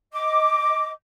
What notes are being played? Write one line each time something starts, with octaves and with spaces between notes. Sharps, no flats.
D#5 D6